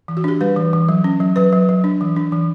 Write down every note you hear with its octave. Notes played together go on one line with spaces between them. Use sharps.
E3
F#4
D4 G4
G3 B4
E3
E3
F#3
C#4
F#3
F#3 B4
F#3
F#3
D4
E3
D4
E3